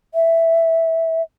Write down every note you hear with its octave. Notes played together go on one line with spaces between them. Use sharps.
E5